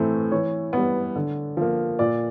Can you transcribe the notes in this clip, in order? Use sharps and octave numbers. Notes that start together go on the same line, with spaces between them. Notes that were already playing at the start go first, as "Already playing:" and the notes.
Already playing: A2 E3 A3 C4
E3 C#5
G3 B3
D3
F3 A#3
A#2 D5